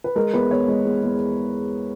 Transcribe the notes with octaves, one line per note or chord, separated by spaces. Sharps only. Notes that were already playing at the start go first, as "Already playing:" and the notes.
B4
G#3 A#4
E2 B4
E2 C#5
G#3
E2
E2